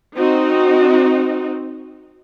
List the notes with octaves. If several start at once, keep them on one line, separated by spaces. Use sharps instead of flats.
C4 D#4 F#4